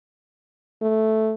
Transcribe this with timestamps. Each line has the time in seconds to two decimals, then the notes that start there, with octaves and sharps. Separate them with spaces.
0.82 A3